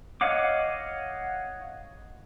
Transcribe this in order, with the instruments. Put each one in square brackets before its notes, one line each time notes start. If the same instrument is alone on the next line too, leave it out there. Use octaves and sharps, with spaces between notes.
[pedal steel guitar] C#5 D#5 F5 F#5 D6